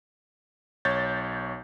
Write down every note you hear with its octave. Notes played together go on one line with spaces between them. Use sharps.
B1 C#5 G6 A6